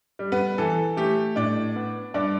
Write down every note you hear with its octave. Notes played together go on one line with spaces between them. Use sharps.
G3
B3 B4
E3 A4
A3 G4
A2 D4 D5
B3
G2 D4 D5